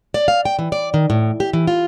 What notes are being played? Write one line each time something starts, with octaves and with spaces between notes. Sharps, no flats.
D5
F5
G5
E3
D5
D#3
A2
G4
E3
F4